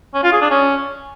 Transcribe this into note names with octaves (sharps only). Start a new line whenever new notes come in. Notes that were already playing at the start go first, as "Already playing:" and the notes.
C#4
F4
G#4
D4
C#4